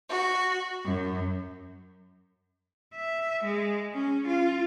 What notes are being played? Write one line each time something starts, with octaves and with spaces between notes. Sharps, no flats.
F#4
F#2
E5
G#3
C#4
F4